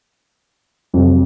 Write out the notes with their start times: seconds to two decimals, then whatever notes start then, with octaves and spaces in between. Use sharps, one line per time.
0.94 F2 C3 F#3